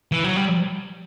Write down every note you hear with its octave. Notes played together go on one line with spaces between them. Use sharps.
E3
F#3
G3